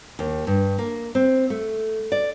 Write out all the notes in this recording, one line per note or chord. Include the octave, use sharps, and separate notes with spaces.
D#2
G2
A#3
C4
A3
D5